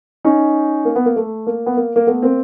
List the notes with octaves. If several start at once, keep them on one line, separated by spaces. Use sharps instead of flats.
C#4 D#4
A#3
B3
A#3
A3
A#3
B3
A#3
A#3
A3 B3
A#3 C4